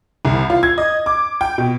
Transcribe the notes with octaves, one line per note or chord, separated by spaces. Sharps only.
C2
F4
G#6
D#5
D6
G5
B2